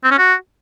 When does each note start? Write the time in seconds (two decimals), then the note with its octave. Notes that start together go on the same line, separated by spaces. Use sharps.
0.04 C4
0.11 C#4
0.18 F#4